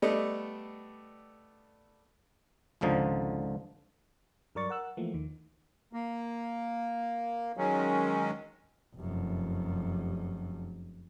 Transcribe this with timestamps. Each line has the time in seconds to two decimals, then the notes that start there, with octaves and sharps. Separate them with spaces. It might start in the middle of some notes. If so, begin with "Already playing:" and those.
0.02 G3 A3 B3 D4 A4 D#5
2.81 G#1 C#2 D3 F3 D#4
4.55 G2 F#3 A#4 D5 C#6 A6
4.69 A#4 F#5 E6 F#6
4.97 E3 F3 A3 A#3
5.14 D#2 D#3
5.93 A#3
7.57 D#3 F#3 G#3 C#4
8.96 F1 F#2